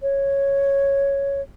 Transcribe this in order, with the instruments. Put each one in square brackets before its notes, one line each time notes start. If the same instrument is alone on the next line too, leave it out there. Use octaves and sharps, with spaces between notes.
[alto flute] C#5